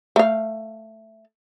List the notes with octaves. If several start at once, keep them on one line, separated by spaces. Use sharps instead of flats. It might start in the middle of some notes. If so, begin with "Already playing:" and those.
A3 F5